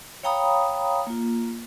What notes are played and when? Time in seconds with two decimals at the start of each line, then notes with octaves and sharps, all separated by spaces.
0.23 C#5 F5 G5 A#5 B5 D#6
1.07 A#3 F4